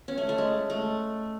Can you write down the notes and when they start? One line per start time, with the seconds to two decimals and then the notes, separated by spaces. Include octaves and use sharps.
0.08 C#4
0.18 A3
0.29 A3
0.38 G#3
0.70 A3